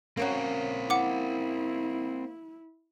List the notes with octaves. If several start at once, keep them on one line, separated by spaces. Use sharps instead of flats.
A#3 C4 C#4 F#4 A#4
E4 F#5 D6